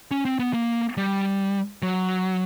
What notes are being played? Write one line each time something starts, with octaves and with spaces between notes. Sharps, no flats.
C#4
C4
B3
A#3
G3
F#3